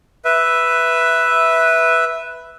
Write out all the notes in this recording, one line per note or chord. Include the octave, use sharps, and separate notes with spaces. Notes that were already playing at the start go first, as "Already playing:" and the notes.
B4 E5